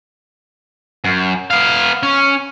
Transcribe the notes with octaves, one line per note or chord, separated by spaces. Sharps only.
F#2
B3 F5
C#4